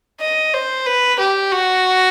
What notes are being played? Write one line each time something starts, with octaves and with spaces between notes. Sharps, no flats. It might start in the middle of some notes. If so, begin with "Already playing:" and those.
D#5
C5
B4
G4
F#4